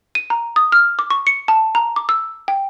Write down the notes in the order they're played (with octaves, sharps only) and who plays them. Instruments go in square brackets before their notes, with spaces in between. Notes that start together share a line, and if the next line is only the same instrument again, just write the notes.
[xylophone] D#7
A#5
D#6
F6
D6
C#6
C#7
A5
A#5
D6
E6
G5